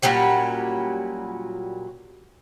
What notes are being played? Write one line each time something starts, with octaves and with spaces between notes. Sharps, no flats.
A#2 F#3 G3 C#4